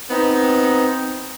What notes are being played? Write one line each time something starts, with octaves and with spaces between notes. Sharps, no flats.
B3 C4 D#4